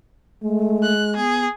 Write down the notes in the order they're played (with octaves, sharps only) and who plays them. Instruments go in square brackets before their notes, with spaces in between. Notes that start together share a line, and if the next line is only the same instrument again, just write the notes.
[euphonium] G#3 [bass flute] A3
[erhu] F#6
[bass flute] B3 [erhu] G#4